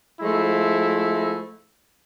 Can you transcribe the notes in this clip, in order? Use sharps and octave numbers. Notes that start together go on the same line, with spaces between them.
F3 G#3 A3 E4